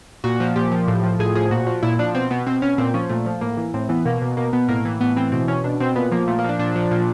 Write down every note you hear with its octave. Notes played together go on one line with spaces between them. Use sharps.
A#2 F#4
F3
A#2 G4
F3
A2
F3
A2 G#4
F3 G#4
A#2 F#4
F3
A#2 E4
F3 D4
B2 C4
B2 B3
B2 C4
B2 C#4
A#2 C4
F3 C#4
A#2 A3
F3
A2 A#3
E3
A2 C4
E3 B3
B2 A#3
B2
B2 A#3
B2 B3
A2 A#3
E3
A2 B3
E3 C4
B2 C4
B2 C#4
B2 D4
B2 C4
A#2 B3
F3 A#3
A#2 A3
A#3
F3 D4
A#2 D4
F3
A#2